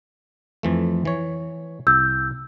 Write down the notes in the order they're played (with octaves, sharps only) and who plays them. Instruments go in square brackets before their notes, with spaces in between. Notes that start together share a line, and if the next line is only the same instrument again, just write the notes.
[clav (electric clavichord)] F2 E3 A3
E3 C#5
[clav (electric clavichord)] C2 [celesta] E6 G6